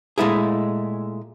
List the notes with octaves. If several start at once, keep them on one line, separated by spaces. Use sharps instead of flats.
A#2 G#3 A3 E4 G#4